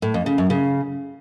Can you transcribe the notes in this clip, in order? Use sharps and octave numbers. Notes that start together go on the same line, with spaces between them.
A2
F2
C#3
F#2
C#3